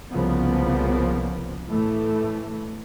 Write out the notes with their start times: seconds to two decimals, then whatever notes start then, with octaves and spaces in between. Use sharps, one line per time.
0.12 C2 C#3 F3 A#3 B3
1.68 A2 E3 A3